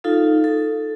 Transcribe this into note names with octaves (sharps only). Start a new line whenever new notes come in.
D#4 F4 A4 F5
A4